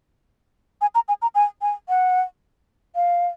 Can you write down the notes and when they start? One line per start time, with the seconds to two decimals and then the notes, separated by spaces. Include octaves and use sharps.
0.81 G#5
0.95 A#5
1.08 G#5
1.22 A#5
1.35 G#5
1.62 G#5
1.89 F#5
2.95 F5